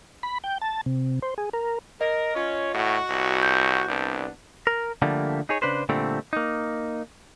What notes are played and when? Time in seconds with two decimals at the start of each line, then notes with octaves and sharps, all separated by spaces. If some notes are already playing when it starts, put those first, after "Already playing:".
0.23 B5
0.44 G5
0.61 A5
0.86 C3
1.22 C5
1.38 G#4
1.53 A#4
2.01 A#4 D#5
2.35 C#4 F4 C#5
2.74 A2 F#4
3.10 C2
3.43 G6
3.88 C2 B3 D4
4.67 A#4
5.02 D3 F3 G3 A3 A#3
5.49 D#4 G#4 C#5
5.62 C#3 D4 B4 C5
5.89 A#2 D3 G3 A3 C4
6.33 A#3 D#4